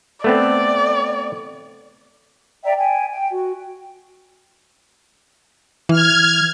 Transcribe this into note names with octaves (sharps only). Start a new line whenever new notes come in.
A3 B3 C4 D5
D5 E5 G5 A#5
G5 G#5
G5
F#4
E3 F6 G#6